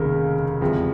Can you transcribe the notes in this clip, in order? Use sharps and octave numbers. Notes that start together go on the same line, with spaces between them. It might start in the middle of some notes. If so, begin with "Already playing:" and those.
Already playing: F1 D#2 C#3 A#4
E2 C3 F3 G#3